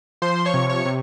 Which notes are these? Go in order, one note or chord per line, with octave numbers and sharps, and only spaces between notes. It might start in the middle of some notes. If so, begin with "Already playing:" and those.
F3 C5 C6
C#5 C#6
C3
C#5 C#6
C3